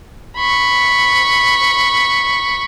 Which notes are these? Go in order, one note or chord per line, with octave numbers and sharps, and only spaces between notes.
B5 C#6